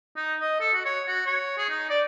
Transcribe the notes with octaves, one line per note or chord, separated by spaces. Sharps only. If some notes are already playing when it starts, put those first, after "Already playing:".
D#4
D#5
A4
F#4
C#5
F#4
C#5
G#4
D#4
D5